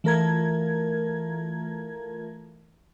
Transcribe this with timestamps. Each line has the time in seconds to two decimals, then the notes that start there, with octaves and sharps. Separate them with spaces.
0.04 E3 A3 F4 A#4 A#5 G#6